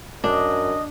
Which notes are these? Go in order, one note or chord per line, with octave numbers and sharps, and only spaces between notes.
F#2 D4 D#5